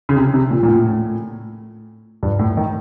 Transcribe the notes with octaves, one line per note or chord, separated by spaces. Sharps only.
C#3
C3
C3
A#2
A#2
A2
G2
A2
D#3